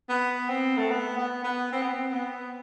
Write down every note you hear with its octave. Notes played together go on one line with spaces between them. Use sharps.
B3
C4
A3
B3
B3
B3
C4
B3
C4
B3